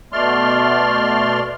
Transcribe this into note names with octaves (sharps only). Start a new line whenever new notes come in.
B2 A3 D5 C6 F6